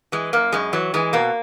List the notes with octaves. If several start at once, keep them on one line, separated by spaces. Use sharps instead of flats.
E3 G#3
F#2 A#3
F#2 G#3
E3 F#3
E3 G#3
B2 A#3